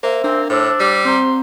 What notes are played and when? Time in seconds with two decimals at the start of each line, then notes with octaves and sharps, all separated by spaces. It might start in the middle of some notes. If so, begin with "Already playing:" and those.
0.03 A#3 C5 E5
0.24 A#3 C4 D4
0.50 A2 D4 C5 E6
0.80 G3
1.05 C4 C5 A#5